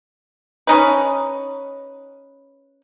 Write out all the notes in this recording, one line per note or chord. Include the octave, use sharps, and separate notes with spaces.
C#4 D#4 B4